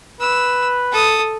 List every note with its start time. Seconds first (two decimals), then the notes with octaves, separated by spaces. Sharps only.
0.21 B4 E6
0.92 A4 D#6